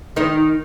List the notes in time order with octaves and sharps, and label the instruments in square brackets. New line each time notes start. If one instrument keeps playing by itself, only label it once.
[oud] D#3 D#4